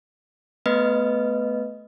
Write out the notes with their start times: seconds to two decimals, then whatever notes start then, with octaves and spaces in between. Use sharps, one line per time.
0.66 A3 B3 B4 D#5